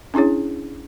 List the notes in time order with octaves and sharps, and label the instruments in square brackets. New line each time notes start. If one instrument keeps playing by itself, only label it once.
[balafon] C#4 D4 E4 G#4 C#5